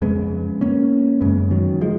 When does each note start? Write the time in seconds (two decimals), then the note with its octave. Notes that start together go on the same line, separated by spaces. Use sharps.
0.02 F2 C#3 G#3 B3
0.61 A#3 C#4
1.21 F#2 C#3 G#3 B3
1.51 D#3 F#3
1.81 F3 G#3